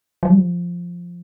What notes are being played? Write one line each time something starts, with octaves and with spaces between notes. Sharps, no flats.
F3
G3
F3